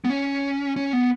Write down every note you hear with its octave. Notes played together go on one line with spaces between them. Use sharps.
B3
C#4
C#4
B3